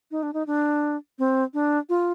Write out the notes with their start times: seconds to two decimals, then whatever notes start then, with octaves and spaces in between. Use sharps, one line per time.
0.11 D#4
0.23 D4
0.34 D#4
0.47 D4
1.19 C4
1.54 D4
1.89 F4